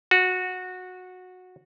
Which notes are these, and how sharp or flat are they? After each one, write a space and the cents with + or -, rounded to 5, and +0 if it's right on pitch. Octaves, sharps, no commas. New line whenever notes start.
F#4 -15